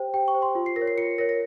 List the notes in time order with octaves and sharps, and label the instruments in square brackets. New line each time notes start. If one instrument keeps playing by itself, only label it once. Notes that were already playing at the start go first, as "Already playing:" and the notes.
Already playing: [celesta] G4 C5 G5
G4 G5
C#6
C5
C6
F4
C7
A#4 A#6
C#5
C7
F4 C#7
A#4 C#5 A#6
A#6